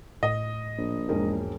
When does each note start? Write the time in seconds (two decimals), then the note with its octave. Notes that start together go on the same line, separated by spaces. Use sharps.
0.23 A2 D#5
0.78 A#1
1.09 E1 G#2 D#4 A#4